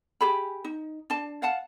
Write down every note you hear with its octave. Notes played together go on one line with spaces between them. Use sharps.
G4 G#4 G#5 B5
D#4
D4 A5
F5 F#5 A5